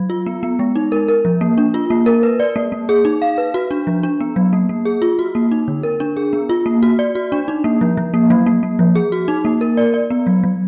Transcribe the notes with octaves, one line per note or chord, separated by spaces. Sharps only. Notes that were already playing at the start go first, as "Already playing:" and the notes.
Already playing: F#3
F4
B3
B3
G#3
D#4
A#4
A#4
F3
A#3
D4
F4
A#3
A#4
B4
D5
A#3
A#3
G#4
D#4
F5
B4
F#4
D4
F3
D4
B3
F#3
A#3
A#3
G#4
F4
F#4
A#3
D#4
D3
A#4
D4
G#4
B3
F4
A#3
F#4
D5
F#4
D4
D#4
A#3
F3
F3
A#3
F#3
A#3
A#3
F3
G#4
F#4
D#4
A#3
A#4
D5
D5
B3
F#3
F#3